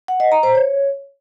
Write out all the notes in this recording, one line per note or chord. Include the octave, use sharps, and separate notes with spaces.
F#5
D#5
A#5
C5
C#5